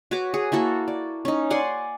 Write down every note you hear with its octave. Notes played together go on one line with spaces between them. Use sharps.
F#4 B4 C#5 D6
G#4
A#3 E4 F#4 A4
D5
C#4 D#4
D5 F#5 G#5 C6